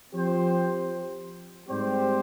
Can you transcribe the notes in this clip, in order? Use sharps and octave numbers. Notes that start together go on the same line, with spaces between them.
F3 C4 G4 C5
G#2 G3 C4 G4 C5